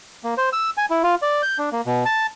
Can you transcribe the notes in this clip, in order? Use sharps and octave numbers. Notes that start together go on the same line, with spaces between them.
A#3
C5
E6
G#5
E4
F4
D5
G6
D4
A#3
B2
A5